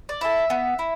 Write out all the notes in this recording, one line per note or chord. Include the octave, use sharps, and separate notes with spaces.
D5
E4 A4 E5
B3
E4